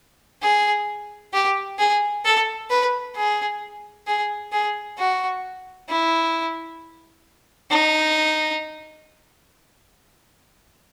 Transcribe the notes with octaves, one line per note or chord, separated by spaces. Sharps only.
G#4
G4
G#4
A4
B4
G#4
G#4
G#4
F#4
E4
D#4